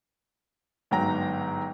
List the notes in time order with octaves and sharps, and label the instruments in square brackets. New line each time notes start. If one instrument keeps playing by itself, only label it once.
[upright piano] G1 G#2 F#3 G5 A#5 A#6